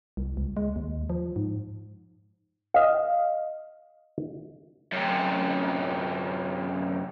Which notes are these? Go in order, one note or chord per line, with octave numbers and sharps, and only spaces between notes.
C2
C#2
G#3
D#2
F3
G#2
D#5 F5
F#2 C3